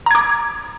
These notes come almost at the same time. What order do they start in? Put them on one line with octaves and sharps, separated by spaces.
A#5 G#6 D6